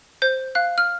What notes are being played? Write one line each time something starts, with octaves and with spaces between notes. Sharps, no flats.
C5 G6
F5 F#6
F6